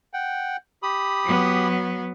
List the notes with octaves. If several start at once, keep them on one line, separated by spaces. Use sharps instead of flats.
F#5 G5
G4 B5 D#6
F#3 B3